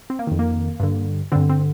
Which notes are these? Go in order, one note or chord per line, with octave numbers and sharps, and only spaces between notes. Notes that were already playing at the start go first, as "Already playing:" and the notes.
C4
A#3
F2 D#3
A#3
G2 D3
G2 D3 C4
C4